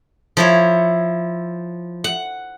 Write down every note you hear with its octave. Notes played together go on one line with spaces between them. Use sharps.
F3 E4 C#5
F#5